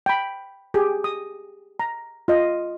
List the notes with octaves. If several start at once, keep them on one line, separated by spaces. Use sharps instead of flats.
G5 B5
G4 G#4
D#6
A#5
F4 D#5